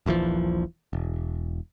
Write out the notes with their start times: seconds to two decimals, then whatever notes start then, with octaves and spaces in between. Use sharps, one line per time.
0.06 D#1 A#1 E3 F3
0.93 E1